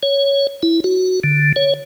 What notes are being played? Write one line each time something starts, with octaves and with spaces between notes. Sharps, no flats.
C#5
E4
F#4
D3
C#5